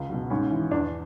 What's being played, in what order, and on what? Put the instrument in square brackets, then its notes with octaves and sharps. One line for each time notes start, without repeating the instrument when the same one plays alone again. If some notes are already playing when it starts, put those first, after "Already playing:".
Already playing: [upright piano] C#2
B2 F#3
G#2 C#4
E3
E2 D4